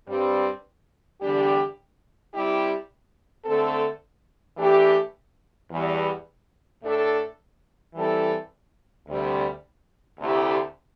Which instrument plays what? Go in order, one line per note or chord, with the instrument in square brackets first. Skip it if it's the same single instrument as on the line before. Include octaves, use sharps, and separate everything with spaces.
[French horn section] G2 G3 C4
E2 D3 G3 D4 G4
C3 G3 E4 G4
D3 A3 C4 A4
E3 A3 D4 G4
E2 E3 G3
A2 A3 D4 A4
E3 G3 C4 E4 A4
D2 C3 G3
D2 C3 A3 E4 G4